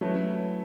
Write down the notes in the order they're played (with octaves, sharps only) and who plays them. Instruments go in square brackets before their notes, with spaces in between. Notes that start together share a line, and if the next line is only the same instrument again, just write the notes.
[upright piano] F#3 A3 C#4 E4 B4